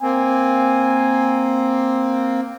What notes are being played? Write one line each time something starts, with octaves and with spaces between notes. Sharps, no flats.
A#3 C4 G#5